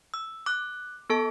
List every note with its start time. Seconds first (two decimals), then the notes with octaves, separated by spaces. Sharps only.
0.14 E6
0.46 D6 F#6
1.10 B3 A4 A5